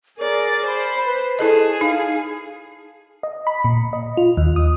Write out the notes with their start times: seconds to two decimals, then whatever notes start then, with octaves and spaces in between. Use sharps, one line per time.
0.18 G#4 A#4 D5
0.66 C5 B5
1.06 B4
1.39 E4 G#4 A4 D#5 A5
1.81 D#4 F5
3.23 D#5
3.47 B5
3.64 A#2
3.93 D#5
4.17 F4
4.37 D#2
4.56 D#6